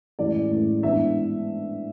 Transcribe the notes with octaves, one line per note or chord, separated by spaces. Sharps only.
A2 E3 G#3 C#4 D5
A2 E3 G#3 C#4
G#2 E3 B3 D4 E5